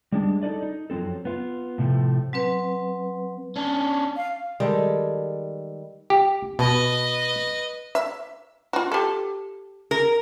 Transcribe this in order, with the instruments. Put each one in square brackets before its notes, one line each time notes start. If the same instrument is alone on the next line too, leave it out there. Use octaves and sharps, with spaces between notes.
[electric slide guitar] G3 G#3 D4
D#4 A4 B4 D5 D#5
D#4
F#2 F3 F#3 C4 A4
B3 F4
A2 C3 F3 A3
[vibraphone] F#3 C4 B4
[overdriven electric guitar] C#4 D4
[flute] F5
[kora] D#3 G3 G#3 A4
[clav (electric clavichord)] G4
[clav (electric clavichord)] B2 [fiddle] B4 D#5
[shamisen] E5
F4 F#4
G4 A4
[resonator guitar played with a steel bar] A#4